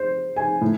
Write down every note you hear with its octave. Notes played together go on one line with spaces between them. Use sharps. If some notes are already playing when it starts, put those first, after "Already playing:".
Already playing: C5
G#5
A2